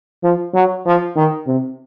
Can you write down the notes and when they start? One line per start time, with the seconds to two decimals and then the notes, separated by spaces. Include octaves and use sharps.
0.24 F3
0.55 F#3
0.86 F3
1.16 D#3
1.47 C3